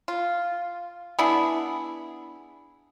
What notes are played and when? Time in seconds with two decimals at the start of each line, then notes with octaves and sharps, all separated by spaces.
0.08 F4
1.19 B3 D4 E4 G#4